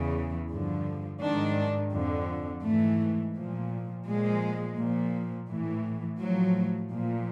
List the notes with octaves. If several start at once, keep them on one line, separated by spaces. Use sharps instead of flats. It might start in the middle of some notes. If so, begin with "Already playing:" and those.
Already playing: E2 C#3 E3
G2 D3 F3
G#2 D#3 D4
F2 D3 F3
G#2 E3 A3
A#2 F3
A#2 F3 G#3
A#2 F3
A2 E3
A2 F3 F#3
A#2 F3